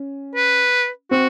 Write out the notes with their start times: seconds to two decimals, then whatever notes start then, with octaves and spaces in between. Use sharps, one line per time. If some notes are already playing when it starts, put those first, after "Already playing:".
Already playing: C#4
0.35 B4
1.11 C4 F#4